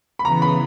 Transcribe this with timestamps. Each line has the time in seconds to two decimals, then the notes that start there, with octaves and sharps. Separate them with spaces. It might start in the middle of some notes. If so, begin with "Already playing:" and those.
0.19 B5
0.25 C#3 E3 B3 A#5
0.42 B5